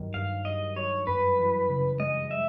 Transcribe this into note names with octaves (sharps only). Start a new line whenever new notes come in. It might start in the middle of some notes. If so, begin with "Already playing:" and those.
Already playing: G2 D#3 F#3
G2 F5
G2 D#5
F#3 C#5
F#2 B4
E3
C#3
G#3 D#5
E5